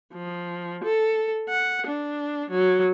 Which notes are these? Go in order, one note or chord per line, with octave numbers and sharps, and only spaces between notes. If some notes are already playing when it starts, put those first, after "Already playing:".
F3
A4
F#5
D4
F#3